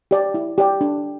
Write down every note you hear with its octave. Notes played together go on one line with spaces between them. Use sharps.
G4 D5 G5
E4
G4 D5 G5
D4